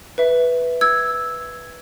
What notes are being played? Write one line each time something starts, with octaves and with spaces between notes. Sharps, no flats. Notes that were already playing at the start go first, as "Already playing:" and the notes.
B4 E5
E6 G#6